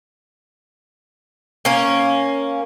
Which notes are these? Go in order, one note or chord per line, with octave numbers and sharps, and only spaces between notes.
A#3 C#4